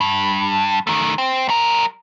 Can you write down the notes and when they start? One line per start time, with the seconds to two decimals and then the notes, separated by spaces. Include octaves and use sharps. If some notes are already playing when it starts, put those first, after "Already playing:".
0.01 G2
0.87 D#3 A3
1.18 C4
1.49 G3 A#4